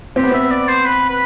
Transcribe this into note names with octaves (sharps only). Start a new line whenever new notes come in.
C4 G4
B3
C4 E5
D5
C5
B4
B4